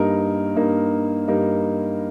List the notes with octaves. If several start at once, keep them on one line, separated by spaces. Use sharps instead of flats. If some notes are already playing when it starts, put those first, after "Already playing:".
Already playing: G2 G3 A#3 D#4 A#4
G2 G3 A#3 D#4 A#4
G2 G3 A#3 D#4 A#4